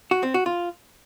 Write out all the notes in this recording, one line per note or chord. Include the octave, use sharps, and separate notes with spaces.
F#4
C4
F#4
F4